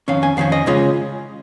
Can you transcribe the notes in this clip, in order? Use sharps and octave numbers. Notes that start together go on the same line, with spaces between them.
F2 D#3 C#4 F5
G#5
F2 D#3 C#4 F5
D#5
C#3 G#3 C#4 F4